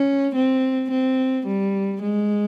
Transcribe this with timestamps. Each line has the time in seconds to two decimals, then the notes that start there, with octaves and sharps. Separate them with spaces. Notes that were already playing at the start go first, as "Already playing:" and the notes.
Already playing: C#4
0.35 C4
0.91 C4
1.47 G3
2.03 G#3